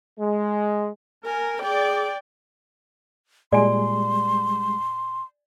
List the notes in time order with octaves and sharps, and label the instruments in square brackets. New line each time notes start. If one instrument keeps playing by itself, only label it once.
[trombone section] G#3
[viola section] A#4 [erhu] G#5
[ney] G#4 [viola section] D5 [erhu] G5
[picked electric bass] A#2 [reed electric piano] G3 G#3 [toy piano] D5 G#5 [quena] C6